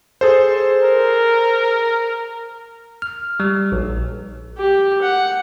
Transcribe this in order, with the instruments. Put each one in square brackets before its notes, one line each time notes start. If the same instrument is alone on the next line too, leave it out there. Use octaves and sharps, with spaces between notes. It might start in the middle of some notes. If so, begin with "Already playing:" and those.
[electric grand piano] G#4 A4 C5
[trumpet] A#4
[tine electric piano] F6
G3
A#1
[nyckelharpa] G4
F#5